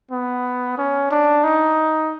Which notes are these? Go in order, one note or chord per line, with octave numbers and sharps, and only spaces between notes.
B3
C#4
D4
D#4